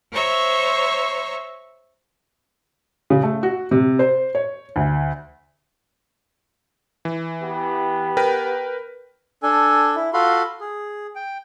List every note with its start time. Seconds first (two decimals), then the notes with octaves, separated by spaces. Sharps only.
0.12 C5 C#5 E5 A#5 C#6
3.10 C#3
3.23 A3
3.43 F#4
3.71 C3
3.99 C5
4.35 C#5
4.76 D2
7.05 E3
7.43 B3 G4
8.17 A#4 B4 G5
9.43 D4 A4 G#5
9.96 E4
10.13 F4 F#4 A4 F5 B5 C6
10.61 G#4
11.16 G5